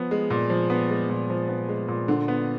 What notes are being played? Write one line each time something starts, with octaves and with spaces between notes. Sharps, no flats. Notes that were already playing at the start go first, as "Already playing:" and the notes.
Already playing: F3 B3
G#3
A#2
F3
B3
G#3
A#2
F3
B3
G#3
A#2
D3
B3